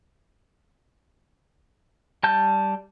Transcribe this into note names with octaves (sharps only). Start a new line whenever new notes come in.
G3 A5 G6